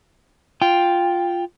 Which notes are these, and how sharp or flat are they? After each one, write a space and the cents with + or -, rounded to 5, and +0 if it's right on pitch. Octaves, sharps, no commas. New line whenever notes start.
F4 +0 G5 +5